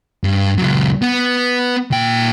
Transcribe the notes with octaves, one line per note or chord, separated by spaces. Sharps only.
G2
C#2 F#3
B3
A#2 G5